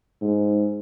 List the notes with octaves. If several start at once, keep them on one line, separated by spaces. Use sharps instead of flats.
G#2